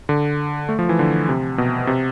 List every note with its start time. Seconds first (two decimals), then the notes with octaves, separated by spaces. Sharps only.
0.09 D3
0.69 A3
0.79 F3
0.89 E3
0.99 D3
1.29 C3
1.58 B2
1.87 C3